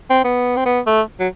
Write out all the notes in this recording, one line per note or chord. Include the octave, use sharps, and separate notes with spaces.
C4
B3
C4
B3
A3
F#3